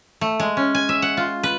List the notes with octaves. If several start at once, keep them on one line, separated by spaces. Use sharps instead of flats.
A3
G#3
C#4
G#5
E5
F#5
F4
B4